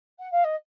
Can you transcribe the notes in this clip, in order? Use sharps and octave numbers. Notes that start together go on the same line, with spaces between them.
F#5
F5
D#5